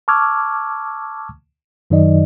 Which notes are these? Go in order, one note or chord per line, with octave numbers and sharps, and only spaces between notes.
A5 C#6 D6 E6 F6 G#6
F#2 D#3 F#3 D#4 D5 D#5